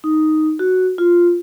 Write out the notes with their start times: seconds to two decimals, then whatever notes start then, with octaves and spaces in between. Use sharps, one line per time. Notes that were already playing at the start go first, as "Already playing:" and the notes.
0.04 D#4
0.59 F#4
0.98 F4